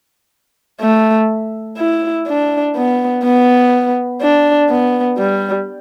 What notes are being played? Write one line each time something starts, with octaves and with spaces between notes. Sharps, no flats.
A3
E4
D4
B3
B3
D4
B3
G3